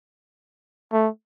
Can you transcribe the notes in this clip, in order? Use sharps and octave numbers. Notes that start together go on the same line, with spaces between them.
A3